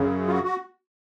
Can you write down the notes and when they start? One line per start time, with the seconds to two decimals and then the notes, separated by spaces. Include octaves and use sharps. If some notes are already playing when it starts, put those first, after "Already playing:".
Already playing: F#2 C#3
0.27 F4
0.31 F#4
0.43 F#4